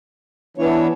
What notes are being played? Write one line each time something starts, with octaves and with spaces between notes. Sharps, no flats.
E3 B3 D4 C#5